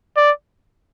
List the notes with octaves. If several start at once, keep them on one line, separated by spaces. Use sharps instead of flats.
D5